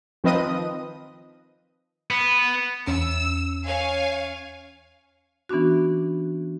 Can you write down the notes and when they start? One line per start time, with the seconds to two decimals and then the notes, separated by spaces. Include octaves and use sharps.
0.24 D#3 F3 C4 B4 D#5 D#6
2.11 B3
2.87 E2 C#4 E6
3.65 C#5 F5 G#5
5.49 E3 B3 C#4 D4 F#4